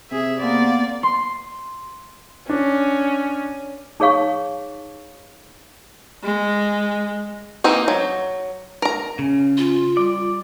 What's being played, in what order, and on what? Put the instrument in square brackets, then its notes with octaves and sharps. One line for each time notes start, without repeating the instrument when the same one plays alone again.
[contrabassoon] C3 [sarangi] G#4 [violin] E5
[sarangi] A#3 [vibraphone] B3 F#5 C6 [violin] D5
[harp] C6
[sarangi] C#4 [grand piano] D4
[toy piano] D#4 G#4 C#5 F5 C#6
[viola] G#3
[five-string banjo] E3 A#3 C4 D#4
F#3
A#4 A#5
[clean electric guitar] C#3 [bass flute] C#4
[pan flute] F4
[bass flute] G3 [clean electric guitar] D5